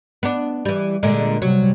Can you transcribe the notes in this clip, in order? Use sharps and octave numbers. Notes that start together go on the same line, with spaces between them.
B3 D4
E3 G3
A#2 D3 G#3
C3 F#3 G3